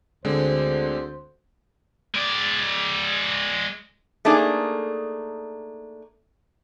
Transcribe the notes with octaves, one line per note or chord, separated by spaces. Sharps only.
D2 D3 G#3 C4 C5
G#3 D5
A3 A#3 D4 D#4 G#4